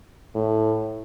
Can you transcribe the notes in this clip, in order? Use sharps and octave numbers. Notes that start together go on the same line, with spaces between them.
A2